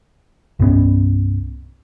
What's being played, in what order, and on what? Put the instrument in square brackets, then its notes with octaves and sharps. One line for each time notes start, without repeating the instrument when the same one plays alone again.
[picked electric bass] C2 G2 B3 C#4